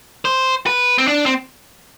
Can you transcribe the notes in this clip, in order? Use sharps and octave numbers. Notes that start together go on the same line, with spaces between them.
C5
B4
C4
D4
C4